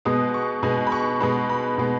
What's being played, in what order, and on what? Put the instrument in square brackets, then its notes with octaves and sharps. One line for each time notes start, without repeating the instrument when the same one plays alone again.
[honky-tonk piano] B2 G#3 B3 D#6
C#6
B2 G#3 B3 G#5
B5
C#6
B2 G#3 B3 B5
B5
B2 G#3 B3